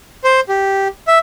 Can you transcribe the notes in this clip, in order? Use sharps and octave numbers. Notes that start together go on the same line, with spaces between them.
C5
G4
E5